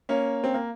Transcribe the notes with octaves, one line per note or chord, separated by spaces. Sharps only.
A#3 C#4
C4
A#3